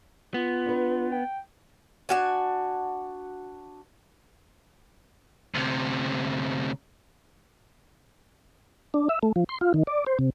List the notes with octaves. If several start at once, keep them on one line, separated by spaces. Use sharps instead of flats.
B3 F4
D4 B4
G5
D4 F#4 G#5
D2 C3
D4
E5
A3
F3
C6
F4
D#3
D5
C5
C3